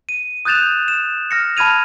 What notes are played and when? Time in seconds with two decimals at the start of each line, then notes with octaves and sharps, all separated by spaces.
0.09 D#7
0.45 D#6 F#6 G6 A6 E7 F7
0.88 E7
1.31 F6 A#6 C#7
1.57 A5 B5 F6 G#6 D#7 F7